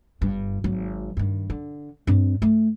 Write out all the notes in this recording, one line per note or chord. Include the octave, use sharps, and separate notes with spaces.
G1 G2
G#1 F#3
G2 D#3
D3
G2 C4
A3